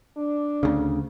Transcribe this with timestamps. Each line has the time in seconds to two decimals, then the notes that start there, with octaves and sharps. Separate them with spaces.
0.17 D4
0.63 D2 C#3